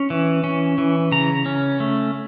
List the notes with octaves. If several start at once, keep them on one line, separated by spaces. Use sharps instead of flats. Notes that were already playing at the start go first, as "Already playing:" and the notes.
Already playing: C#4
E3
C#4
E3
C#3 A#5
C#4
A3